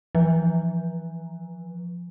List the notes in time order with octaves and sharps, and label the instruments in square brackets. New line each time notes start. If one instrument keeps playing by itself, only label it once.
[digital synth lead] E3 [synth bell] F3